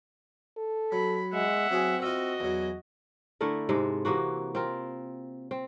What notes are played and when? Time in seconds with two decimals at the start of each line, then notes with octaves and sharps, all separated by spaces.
0.57 A4
0.92 F#3 B5
1.34 G#3 E5 F#5
1.71 F#3 C4 F#4 G#4
2.02 F4 F#4 D#5 E5
2.40 E2 F#3
3.41 D3 A3 E4 A#4
3.69 G#2 C3 G#3 A4
4.05 C3 E3 A#3 F#4
4.55 C4 F4 A#4
5.51 C4